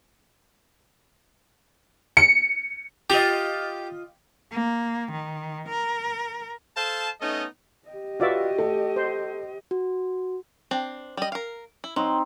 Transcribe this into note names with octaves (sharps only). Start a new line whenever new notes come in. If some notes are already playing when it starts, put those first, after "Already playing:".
C#7
F4 G4 D#5
A#3
D#3
A#4
A4 C5 F5 A5
A3 B3 C#4 D#4 A4 D#5
G4 D#5
F4 F#4 B4 D5 E5
A3
C5
F#4
C4 D4
G3 D#5
A#4 F5
E4
F#3 C4 D#4